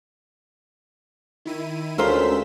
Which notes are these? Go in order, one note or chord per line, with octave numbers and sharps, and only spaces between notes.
D#3 E4 D#7
D2 G#3 C#4 F4 A#4 C5 E6 B6